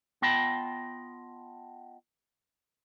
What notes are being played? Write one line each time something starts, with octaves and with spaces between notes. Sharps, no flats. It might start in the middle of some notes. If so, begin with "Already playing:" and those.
B3 F4 D#5 G5 A5 B5